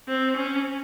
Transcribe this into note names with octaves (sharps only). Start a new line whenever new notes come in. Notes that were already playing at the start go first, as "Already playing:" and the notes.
C4
C#4